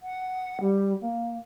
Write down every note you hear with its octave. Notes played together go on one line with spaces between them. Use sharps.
F#5
G3
A#3